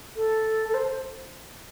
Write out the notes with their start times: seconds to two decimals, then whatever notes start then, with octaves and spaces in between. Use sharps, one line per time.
0.16 A4
0.68 A4
0.74 C5